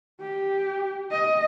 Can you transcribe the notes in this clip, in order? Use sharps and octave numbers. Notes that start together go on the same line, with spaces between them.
G4
D#5